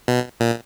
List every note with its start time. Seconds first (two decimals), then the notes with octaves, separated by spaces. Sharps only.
0.08 B2
0.40 A#2